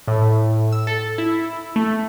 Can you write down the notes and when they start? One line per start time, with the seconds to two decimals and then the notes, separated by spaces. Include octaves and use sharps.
0.08 A2
0.72 E6
0.87 A4
1.18 E4
1.76 A3